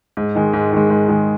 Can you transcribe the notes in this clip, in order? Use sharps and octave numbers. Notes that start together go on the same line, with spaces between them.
G#2
D#3 G#3
G#2
D#3 G#3
G#2
D#3 G#3